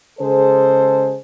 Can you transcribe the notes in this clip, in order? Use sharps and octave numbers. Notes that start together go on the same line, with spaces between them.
C#3 G#3 G#4 A4 C5